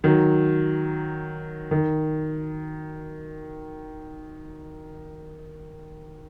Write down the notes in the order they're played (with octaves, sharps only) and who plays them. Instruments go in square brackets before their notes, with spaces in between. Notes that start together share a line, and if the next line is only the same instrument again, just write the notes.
[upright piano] D#3 F#3
D#3